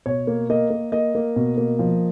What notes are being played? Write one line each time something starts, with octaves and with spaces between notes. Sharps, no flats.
B2 C#5
A#3
A#3 D#5
A#3
A#3 D#5
A#3
B2
A#3
F3